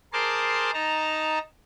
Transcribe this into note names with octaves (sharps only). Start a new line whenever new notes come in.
G#4 A#4 C5 A5 C6 D6
D#4 A5 A#5